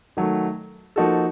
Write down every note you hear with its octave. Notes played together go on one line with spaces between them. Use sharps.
D#3 F#3 A3
F3 A#3 D#4 F#4 A4